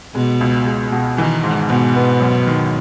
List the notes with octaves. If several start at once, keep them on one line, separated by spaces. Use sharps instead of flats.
B2 G#3
C#2
G#3
B2
D#3 E3
G#2
G#2 B2
B3
F#2
D#3